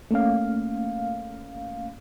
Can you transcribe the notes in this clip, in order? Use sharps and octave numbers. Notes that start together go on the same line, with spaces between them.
A3 A#3 C#4 F5